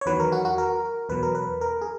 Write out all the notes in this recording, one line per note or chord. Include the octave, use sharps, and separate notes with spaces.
C#5
E2 D#3 F#3 B4
A#4
F#4
F#4
A#4
E2 B2 F#3 B4
A#4
B4
A#4
G#4